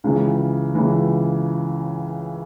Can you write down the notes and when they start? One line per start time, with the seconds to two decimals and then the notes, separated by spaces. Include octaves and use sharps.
0.04 C#2 C#3 E3
0.75 C#2 C#3 E3